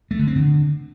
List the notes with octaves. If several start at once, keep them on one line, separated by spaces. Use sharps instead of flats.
A3
D3
C4
D3